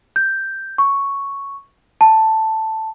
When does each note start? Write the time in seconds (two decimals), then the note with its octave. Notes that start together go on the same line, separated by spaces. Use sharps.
0.16 G6
0.78 C#6
2.01 A5